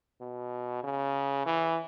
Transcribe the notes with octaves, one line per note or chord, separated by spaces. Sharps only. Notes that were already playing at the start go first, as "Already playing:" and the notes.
B2
C#3
E3